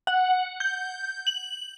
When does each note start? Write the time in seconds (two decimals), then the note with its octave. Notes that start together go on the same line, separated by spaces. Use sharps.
0.07 F#5
0.60 G6
1.27 F#7